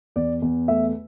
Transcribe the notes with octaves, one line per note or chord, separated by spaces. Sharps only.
E2 D5
E2
A3 E5